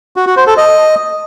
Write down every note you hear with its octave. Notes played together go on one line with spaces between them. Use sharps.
F#4
F#4
C5
A4
D#5